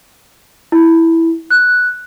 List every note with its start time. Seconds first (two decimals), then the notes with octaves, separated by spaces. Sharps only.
0.72 E4
1.50 F#6